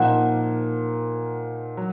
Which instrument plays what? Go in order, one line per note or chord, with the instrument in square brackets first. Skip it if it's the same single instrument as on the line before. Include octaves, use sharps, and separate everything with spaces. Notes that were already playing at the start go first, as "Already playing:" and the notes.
Already playing: [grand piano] A#2 F3 A#3 D#4 [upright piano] F#5
[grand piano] F#3